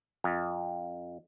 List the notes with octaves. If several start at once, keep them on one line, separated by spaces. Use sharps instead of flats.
F2